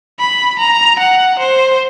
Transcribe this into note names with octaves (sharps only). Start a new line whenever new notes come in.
B5
A#5
F#5
C5